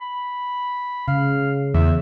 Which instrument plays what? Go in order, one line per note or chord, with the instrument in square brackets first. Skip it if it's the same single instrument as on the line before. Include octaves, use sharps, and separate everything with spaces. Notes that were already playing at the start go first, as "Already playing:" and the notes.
[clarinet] B5
[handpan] C#3 [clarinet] F5
[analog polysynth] E2 [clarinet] E5